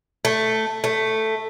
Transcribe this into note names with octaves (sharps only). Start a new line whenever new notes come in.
A3
A3